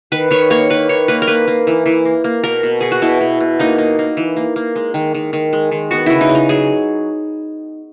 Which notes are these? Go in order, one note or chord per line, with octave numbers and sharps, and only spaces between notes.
D#3 B4
D#3 C#5
A#3 C#5
A#3 B4
D#3 C#5
A#3 B4
A#4
A#3 B4
A#3
E3
E3
A#3
A#3
B2 A#4
B2
B2 G#4
F#4
B2 E4
B2
B2
A#3 D#4
A#3
A#3
E3
A#3
A#3
G#3
D#3
D#3
D#3
G#3
D#3
B3 F#4
C#3 E4
D#4
C#3
D#4
F#3 G#4